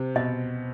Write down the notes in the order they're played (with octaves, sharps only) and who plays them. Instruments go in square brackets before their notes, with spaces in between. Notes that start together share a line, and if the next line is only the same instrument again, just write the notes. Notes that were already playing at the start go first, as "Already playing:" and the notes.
Already playing: [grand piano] C3 [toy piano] C5
[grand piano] B2 [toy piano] D#5